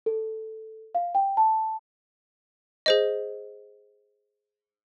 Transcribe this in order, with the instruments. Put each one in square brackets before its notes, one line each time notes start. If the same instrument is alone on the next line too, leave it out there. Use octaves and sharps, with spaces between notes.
[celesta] A4
F5
G5
A5
[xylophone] G#4 C5 D#5